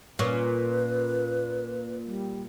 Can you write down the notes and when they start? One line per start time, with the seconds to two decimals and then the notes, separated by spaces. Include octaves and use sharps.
0.19 A#2 C#4 B4
2.06 G3